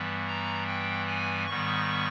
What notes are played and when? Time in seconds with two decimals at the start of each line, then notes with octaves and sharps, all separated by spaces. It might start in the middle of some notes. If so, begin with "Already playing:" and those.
Already playing: G2 E3 G3 B3
0.27 A#5
0.67 G5
1.07 G#5
1.46 G#2 D#3 G3 B3 C#6